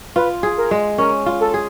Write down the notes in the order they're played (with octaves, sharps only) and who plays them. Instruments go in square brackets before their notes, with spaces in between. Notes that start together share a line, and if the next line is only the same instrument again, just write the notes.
[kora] F4 [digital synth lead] B4
[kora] G#4
[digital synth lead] A#4
[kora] G#3
[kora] C#4 [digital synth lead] A#4
[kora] F4
[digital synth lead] A4
[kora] G#4